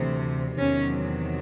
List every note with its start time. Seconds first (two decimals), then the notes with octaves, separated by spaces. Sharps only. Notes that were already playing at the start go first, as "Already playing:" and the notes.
Already playing: D2 C3 E3
0.58 E2 C3 D#3 F#3 C#4